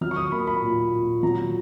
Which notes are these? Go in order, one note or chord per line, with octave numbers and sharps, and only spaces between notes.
F#3 F6
C#6
D#6
A#3 B5
B5
A#2
A#2
F#3 A#5